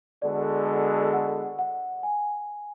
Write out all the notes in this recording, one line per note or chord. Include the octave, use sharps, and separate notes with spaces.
D3 G#3 B3 F#4 A4 D5
F#5
F#5
G#5